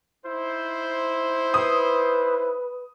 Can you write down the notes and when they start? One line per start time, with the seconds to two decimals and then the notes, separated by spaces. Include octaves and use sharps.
0.25 D#4 E4 C5
1.54 B4 D#6